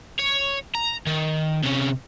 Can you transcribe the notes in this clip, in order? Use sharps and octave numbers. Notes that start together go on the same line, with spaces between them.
C#5
A#5
D#3
C3 C#4